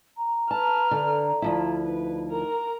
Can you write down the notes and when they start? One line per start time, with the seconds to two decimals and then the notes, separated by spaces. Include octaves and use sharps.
0.17 A#5
0.51 B4 A5 F6
0.91 D3
1.42 D2 F3 E4 F4
1.83 D#4 B4
2.28 A#4 A#5